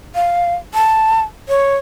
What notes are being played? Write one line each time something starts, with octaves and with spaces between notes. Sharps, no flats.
F5
A5
C#5